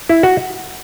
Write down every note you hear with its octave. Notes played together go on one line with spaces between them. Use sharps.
E4
F#4